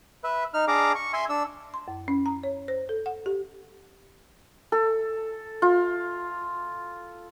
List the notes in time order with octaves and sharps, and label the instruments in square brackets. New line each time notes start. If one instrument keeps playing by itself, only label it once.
[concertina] B4 E5
D#4 F6
D4 G#4 F5 A#5 D6
C#6
E5 G#5 C6
D4 E6
[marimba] C6
F#2
C#4
A#5
C#5
C5
A4
F#5
G4
[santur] A4
F4